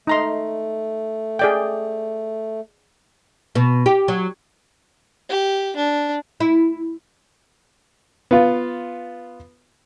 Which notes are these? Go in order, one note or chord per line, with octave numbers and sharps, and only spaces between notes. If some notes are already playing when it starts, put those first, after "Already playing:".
A3 D#4 A#5 C6
G#4 D5 G5
B2
G4
F#3
G4
D4
E4
B3 F4